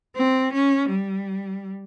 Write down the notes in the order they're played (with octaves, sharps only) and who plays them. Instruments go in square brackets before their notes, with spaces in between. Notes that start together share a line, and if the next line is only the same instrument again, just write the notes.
[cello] C4
C#4
G3